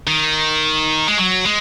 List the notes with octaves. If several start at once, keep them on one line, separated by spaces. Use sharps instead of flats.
D#3
G#3
F#3
G#3